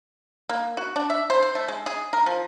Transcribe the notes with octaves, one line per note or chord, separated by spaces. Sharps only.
A#3
F#4
D4
E5
C5
C5
A3
G#3
G#4
A#4
F3